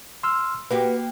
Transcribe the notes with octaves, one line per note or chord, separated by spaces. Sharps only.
C6 E6 F6
A#3 F#4 G4 B4